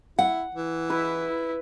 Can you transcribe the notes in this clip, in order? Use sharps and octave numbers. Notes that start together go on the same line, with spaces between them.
E4 F#5
E3
E4 B4